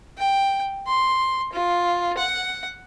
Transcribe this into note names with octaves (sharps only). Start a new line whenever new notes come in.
G5
C6
F4
F#5